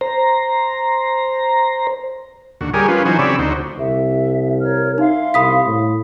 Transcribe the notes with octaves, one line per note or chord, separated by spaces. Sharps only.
C5 A#5
D#2 D3 F#4
G3 G4 G#4 A#4 C#5 G#5
F3 C#4 F4 B4
E3 F#3 D#4 F#4 C5 G#5
C#3 C4 C#5 D5 B5 E6
D2 D#4 F#4 C5
C2 E5
A#4 C#5 F6
D#4 E5 F5 C6
C2 B5 D#6 B6
A2